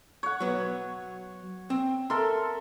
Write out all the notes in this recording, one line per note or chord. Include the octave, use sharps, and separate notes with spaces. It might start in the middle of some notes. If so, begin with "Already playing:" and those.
C#5 F#5
F#3 B3
C4
A4 A#4 E5 C6